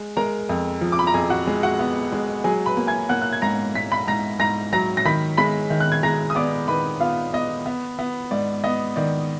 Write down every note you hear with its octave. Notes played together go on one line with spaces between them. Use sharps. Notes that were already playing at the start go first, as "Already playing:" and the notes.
Already playing: G#3
G#3 A#4 A#5
F2
F3
D6
B5
A#5
F2 G#4 G#5
F#4 F#5
G#3
F#4 F#5
B3
G#3
F#3 G#4 G#5
B4 B5
A#3
G#5 G#6
A#3 F#5 F#6
F#6
G#6
G#2 A#5 A#6
G#2 B6
B5 B6
G#2 A#5 A#6
G#2 A#5 A#6
F#3 A#5 A#6
A#6
D#3 B5 B6
G#3 B5 B6
D#3
F#6
G#6
G#3 A#5 A#6
D#6
B3 D5 D6
D#3 B4 B5
B3 F4 F5
B3 D#5
B3
B3
G#2 D5
B3 D#5
D#3 D5